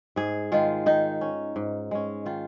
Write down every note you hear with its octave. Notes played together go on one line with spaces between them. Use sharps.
G#2 G#4
D#3 G#3 F4
D#3 D#4
C#4
G#2
G#3 C#4
D#3 F4